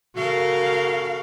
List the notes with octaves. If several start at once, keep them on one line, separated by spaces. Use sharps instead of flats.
C#3 F#4 A4 A#4 F5